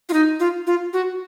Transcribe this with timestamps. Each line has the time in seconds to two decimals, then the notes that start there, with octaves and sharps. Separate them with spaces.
0.09 F4
0.13 D#4
0.40 F4
0.67 F4
0.93 F#4